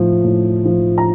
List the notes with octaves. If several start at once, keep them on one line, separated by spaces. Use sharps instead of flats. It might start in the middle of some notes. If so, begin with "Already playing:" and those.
Already playing: A2 F3
A2
F3
A#5